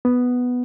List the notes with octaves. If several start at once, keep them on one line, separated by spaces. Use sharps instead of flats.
B3